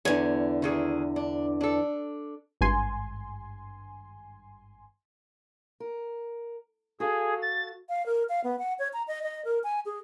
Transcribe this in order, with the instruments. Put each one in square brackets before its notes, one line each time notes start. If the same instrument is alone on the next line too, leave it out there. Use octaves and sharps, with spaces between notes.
[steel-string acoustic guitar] E2 D3 [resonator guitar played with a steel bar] C#5 G#5
[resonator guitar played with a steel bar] D#3 E3 G#4
D4
D4 A4
[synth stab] G#1 G2 G#5 C6
[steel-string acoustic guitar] A#4
[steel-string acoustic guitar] F#4 A4 F5 [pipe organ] G#4
[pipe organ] A6
[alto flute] F5
A#4
F5
B3
F#5
C#5
A#5
D#5
D#5
A#4
G#5
G#4